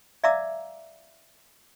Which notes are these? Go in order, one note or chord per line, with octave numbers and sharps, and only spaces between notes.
D5 E5 F5 A#5 D6 E6